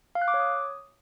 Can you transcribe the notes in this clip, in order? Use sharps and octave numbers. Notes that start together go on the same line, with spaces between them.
F5
F#6
D6
C#5
D#6